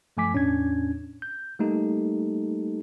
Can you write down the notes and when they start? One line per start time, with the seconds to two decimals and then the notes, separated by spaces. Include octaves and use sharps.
0.17 G2 F3 A3 G#5 D6 B6
0.32 E2 A2 C#4 D4 G#6
1.22 G6
1.59 G3 A3 A#3 D#4 G4 A4